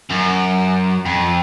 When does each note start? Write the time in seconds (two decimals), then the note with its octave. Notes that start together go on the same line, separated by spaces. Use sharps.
0.10 F#2
1.05 F2